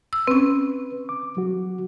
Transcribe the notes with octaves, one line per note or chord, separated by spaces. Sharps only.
E6
C4 C#4 B4
D6
F#3 F#4